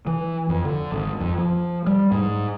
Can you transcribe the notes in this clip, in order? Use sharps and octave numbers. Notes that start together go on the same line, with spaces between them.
E3
F2
D3
G#1
F2
F3
G3
G#2